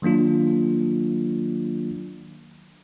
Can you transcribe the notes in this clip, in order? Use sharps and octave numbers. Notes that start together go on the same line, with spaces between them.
D#3 F#3 A#3 D4 F4